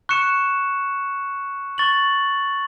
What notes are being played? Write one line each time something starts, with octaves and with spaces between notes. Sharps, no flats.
C#6 F#6 C#7 E7
C#6 A6 F#7